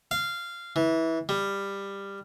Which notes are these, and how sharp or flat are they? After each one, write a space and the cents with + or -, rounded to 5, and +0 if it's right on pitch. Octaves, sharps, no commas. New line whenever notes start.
F5 -15
E3 -20
G3 +15